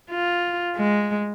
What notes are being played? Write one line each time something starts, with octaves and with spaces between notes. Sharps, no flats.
F4
G#3